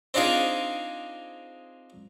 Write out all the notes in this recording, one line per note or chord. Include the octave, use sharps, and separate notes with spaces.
C4 D4 D#4 F4 G#4